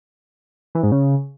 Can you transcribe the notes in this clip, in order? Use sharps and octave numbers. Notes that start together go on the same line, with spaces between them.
E3
G#2
C#3